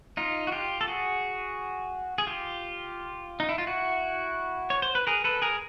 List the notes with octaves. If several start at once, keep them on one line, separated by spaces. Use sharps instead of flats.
D#4 F4
F#4
F4 G4
A4
F#4 G#4
G#4
F4 G4
D#4
E4
F4
E4 F#4
C#5
C5
B4
G#4 A#4
A4 B4
G#4 A#4